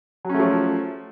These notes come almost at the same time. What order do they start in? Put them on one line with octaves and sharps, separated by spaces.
F#3 C#4 A3 F3